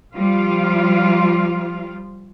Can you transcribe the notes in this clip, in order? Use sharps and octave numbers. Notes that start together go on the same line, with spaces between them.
F3 G3 F4 F5